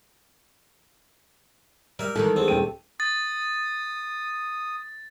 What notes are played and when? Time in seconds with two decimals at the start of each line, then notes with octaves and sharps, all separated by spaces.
1.99 G3 A#4 E5
2.15 D#3 E3 G#3 A4
2.36 E2 C4
2.48 D#1 G5 D#7
3.00 D#6 A6